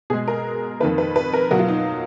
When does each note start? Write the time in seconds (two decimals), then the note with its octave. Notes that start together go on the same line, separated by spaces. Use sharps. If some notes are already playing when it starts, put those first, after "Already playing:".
0.10 B2 G#4
0.13 G#3
0.28 A#4
0.80 F2 D#3 A#3 B4
0.98 B4
1.16 B4
1.33 A#4
1.51 B2 F#3 A#3 F#4
1.59 F4
1.68 D#4